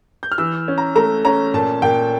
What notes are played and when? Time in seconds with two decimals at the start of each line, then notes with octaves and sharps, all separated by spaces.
0.23 G6
0.32 F6
0.38 E3 E6
0.68 C#4
0.78 A#5
0.96 A3 A#5
1.25 C#4 A#5
1.54 A#2 A5
1.82 A#2 G5